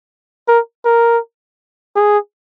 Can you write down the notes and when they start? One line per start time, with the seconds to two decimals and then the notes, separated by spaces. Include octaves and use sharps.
0.48 A#4
0.85 A#4
1.96 G#4